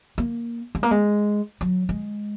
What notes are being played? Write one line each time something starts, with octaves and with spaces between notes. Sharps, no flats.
A#3
G#3
A#3
G#3
F#3
G#3